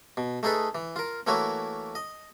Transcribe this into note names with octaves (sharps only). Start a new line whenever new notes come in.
B2
A3 D#4 G#4 A4 B4
E3
F4 A#4
E3 A3 A#3 E4 F#4 C#5
D#5